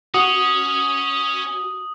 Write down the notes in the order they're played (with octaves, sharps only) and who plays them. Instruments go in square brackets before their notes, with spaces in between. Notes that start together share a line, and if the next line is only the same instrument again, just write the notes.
[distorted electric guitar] C#4 [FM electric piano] F#4 [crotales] D#6